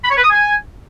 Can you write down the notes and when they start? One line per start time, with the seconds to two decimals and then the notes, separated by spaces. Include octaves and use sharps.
0.04 B5
0.11 C#5
0.17 B4
0.24 D#6
0.30 G#5